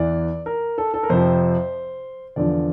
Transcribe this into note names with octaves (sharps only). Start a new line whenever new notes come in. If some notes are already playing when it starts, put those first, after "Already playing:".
Already playing: E2 E3 D5
A#4
A4
A4
A#4
F2 C3 F3 C5
E2 D3 F3 D5